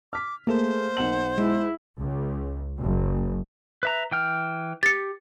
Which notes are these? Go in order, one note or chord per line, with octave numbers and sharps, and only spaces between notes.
D6 F6 B6
A3 A#3 G#4 C5 E7
B1 F#5 E7 F#7
G#3 E4
C#2
F#1
B4 E5 A#5
E3 G5 F6
G4 A6 C#7